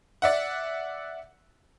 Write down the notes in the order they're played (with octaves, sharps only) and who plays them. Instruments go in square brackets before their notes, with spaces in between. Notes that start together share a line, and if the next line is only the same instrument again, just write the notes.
[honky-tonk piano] D5 E5 F#5